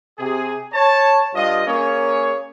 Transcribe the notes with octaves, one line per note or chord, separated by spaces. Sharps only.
C3 G#4
C#5 A5
G2 F4 D#5
A#3 C#4 G#4 C#5